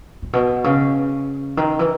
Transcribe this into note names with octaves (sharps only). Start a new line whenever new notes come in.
A2
B2
C#3
D#3
E3